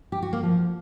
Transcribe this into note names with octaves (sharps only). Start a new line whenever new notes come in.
G4
F#4
A#3
F3